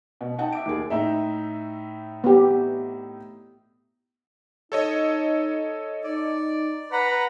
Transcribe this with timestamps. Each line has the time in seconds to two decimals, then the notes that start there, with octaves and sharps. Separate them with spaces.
0.21 B2
0.38 D#4 D#5 F#5 G5 A5
0.52 E5 D6 D7
0.66 D#2 G#4
0.90 A2 D#4 E5
2.24 B3 G4
4.72 D#4 A4 C#5 D#5
6.04 D#4 D5
6.92 B4 F#5 A#5 B5